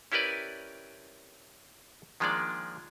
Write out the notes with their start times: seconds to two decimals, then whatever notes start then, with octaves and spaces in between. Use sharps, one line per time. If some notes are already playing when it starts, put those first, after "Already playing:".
0.12 C#4 E4 G4 A#4 B4 D5
2.20 D#3 F3 G#3 A#3 D4 D5